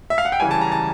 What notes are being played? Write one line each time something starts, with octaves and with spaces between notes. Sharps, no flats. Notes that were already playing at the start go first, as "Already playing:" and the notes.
E5
F5
F#5
G5
C#3 E3 G3 G#5
A5
A#5
A5